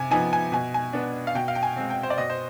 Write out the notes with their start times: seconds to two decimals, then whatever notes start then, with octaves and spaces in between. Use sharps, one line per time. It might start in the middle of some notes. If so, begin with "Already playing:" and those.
Already playing: C3 G#5
0.11 F3 B3 D#4 G#5
0.33 G#5
0.52 B2 G#5
0.74 G#5
0.93 B3 D4
1.27 F5
1.35 B2 G5
1.48 F5
1.55 G5
1.63 G#5
1.77 G#3 C4
1.90 G5
2.03 C5
2.10 D5
2.18 B2 D#5
2.30 C5